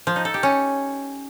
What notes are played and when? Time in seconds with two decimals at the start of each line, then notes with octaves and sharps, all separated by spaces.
0.07 F3
0.16 D#4
0.25 A4
0.34 G4
0.43 C#4